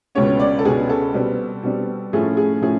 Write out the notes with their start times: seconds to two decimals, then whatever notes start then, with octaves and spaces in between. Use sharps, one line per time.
0.15 C#2 B2 G#3 C#4 C#5
0.40 D5
0.59 A4
0.65 C#2 B2 G#3 C#4 G#4
0.89 A4
1.14 B2 G3 C4
1.63 B2 G3 C4
2.13 A2 F3 A3 C#4 G#4
2.37 G#4
2.61 A2 F3 A3 C#4 G#4